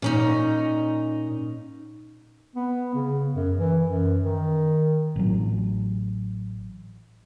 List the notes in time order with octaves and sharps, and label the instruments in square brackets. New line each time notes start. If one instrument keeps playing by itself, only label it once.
[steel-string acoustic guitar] A#2 C#4 D#4
[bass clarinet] B3
C#3
F#2
E3
F#2
D#3
[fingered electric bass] A1 F#3